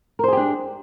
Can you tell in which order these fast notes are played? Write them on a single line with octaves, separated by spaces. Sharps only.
A#4 C5 G#4 G4 D4